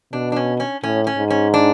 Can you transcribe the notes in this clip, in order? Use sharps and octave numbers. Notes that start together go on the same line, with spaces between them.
B2 D4
D4
C#4
C#4
A2 C#4
C#4
G#2
C#4
D4